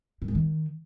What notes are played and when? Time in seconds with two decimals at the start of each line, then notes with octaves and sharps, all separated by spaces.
0.22 G2
0.28 G#2
0.35 D#3